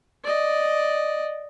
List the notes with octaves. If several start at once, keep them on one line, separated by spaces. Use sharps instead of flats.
D5 D#5